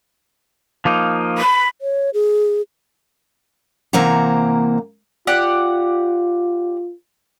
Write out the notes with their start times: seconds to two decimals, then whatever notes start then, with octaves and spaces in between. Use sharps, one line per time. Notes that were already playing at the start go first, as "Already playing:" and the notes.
0.85 F3 A#3 D#4
1.38 B5
1.81 C#5
2.14 G#4
3.93 C3 E3 A#3 C5 F#5 A#5
5.27 F4 G4 D5 F#5